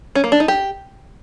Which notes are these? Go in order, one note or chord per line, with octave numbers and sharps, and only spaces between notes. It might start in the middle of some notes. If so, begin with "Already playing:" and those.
C#4
A#3
D4
D#4
G4